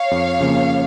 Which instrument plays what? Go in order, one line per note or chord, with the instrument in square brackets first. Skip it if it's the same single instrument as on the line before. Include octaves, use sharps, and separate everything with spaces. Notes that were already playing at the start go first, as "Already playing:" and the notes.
Already playing: [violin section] C#5 F5
[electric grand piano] F2
C#3 F3 A#3